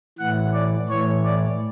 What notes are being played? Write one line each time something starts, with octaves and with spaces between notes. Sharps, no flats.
A2 E3 F#5
D5
A2 E3 C#5
D5